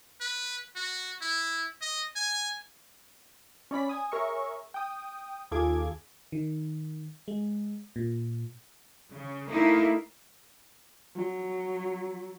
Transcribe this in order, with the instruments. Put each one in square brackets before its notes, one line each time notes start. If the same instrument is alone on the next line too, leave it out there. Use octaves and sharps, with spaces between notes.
[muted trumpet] B4
F#4
E4
D#5
G#5
[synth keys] C#4 D5 B5 B6
G#5 D#6
G#4 A#4 C#5 E5 C#6
G5 D#6
D#2 F4 G#4 A4 D6 G#6
[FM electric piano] D#3
G#3
A#2
[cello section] C#3
A3 A#3 D#4 E4 A#4
[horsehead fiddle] F#3